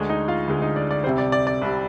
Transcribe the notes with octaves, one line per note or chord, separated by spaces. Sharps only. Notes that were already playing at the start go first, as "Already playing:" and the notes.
Already playing: D2 D3 G#3
D#4 D#5
F4 F5
D2 D3 G#3
D#4 D#5
D5
D5
C2 C3 G3 C5
D5
D5
D5
C2 C3 G3